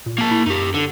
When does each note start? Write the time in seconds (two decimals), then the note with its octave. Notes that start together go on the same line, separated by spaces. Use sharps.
0.06 A#2
0.18 A#3 A5
0.31 E4
0.47 F#2 D#4 G4
0.74 D3